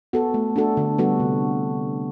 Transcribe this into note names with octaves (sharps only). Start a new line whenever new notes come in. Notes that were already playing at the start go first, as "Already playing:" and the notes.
B3 F#4 A4
A3
D4 F#4 A4
D3
G3 B3 F#4 A4
C3